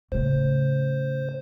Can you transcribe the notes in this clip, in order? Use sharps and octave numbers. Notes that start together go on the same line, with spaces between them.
A2 C#3 C5